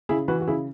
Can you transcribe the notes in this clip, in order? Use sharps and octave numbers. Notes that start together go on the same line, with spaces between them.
C#3 E4 G#4
E3 F#4 B4
F#4
C#3 E4 G#4